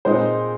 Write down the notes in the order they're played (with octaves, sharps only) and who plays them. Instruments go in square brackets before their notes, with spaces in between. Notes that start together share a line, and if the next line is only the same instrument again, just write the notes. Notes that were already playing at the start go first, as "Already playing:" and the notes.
[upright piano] A#2 G#3 C4 D#4 C5